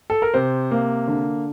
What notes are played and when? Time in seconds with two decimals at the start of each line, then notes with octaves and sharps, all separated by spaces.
0.10 A4
0.22 A#4
0.34 C3 C5
0.71 A#3
1.08 D3